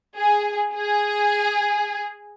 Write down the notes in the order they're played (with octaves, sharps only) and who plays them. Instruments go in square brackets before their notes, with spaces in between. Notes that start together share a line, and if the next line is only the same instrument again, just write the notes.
[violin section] G#4
G#4